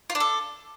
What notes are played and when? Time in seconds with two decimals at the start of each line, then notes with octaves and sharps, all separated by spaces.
0.10 F4
0.15 D4
0.20 A4